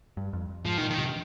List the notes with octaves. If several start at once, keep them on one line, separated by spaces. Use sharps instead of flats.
G2
F2
G#2 F3
D#3
A#2
D#3
C3